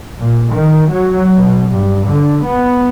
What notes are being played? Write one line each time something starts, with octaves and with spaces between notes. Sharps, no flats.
A#2
D#3
F#3
B2
G2
D3
B3